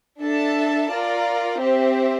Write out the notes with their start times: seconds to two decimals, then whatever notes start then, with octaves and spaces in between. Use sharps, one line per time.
0.21 D4 A4 E5 A5
0.91 F4 A#4 D5
1.62 C4 G4 C5 E5